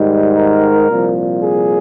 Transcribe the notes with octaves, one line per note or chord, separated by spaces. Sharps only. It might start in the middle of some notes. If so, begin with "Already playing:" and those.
Already playing: G#2 D#3 G3
A#4
C2 A#2 F3
G#4